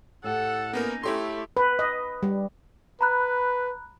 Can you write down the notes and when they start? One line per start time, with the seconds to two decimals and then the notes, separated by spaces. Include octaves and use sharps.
0.24 A2 G4 A4 F#5
0.73 A#3 B3 C#4 D#4 A#4
1.03 A3 E4 G4 A4 C#5 C6
1.57 B4
1.79 D#5
2.23 G3
3.01 B4 A#5 B5 F#6